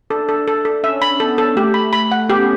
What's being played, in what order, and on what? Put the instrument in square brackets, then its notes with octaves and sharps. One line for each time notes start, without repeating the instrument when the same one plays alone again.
[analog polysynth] D4 [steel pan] A4
[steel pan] A4
A4
A4
[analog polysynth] C#4 [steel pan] E5
[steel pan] B5
[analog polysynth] B3 [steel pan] A4
[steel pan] A4
[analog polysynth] A3 [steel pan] G4
[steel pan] B5
B5
F#5
[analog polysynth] B3 [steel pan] G4
[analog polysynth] C#4